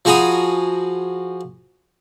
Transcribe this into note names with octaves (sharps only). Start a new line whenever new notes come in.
F3 F#4 G#4 A#5 B5 D#6